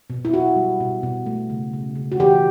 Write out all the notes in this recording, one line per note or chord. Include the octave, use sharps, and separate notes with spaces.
B2
E4
B2 F#4
G3
B2
B2
A3
C#3
C#3
C#3
F#4
E3 G4